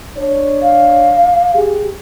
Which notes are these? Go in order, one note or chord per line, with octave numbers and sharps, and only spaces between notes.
D4 C#5
F5
G4 G#4